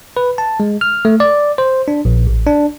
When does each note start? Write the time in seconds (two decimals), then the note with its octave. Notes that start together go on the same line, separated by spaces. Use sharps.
0.17 B4
0.38 A5
0.60 G#3
0.81 F6
1.05 A3
1.20 D5
1.58 C5
1.88 D4
2.05 A#1
2.27 A1
2.46 D4